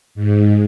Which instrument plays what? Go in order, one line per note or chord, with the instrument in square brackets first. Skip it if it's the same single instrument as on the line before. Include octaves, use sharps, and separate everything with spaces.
[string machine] G#2